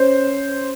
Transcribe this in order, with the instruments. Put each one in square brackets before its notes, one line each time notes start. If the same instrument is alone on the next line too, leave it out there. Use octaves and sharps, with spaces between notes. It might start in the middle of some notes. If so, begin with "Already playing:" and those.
Already playing: [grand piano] C#4 C5